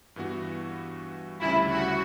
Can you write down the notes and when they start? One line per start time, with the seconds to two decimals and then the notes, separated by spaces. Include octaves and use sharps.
0.16 G2 E3 B3 F#4
1.41 D2 C#3 G3 C#4 E4
1.72 F#4